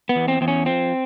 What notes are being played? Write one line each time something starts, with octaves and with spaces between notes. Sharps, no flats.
B3
E2
C4
E2 C4
C#4
F3 C4